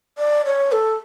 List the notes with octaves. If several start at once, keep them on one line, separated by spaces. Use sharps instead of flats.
D5
C#5
A4